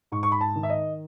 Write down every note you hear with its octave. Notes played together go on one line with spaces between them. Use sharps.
G#2 C#6
C#6
B5
A5
D#3
E5
D#5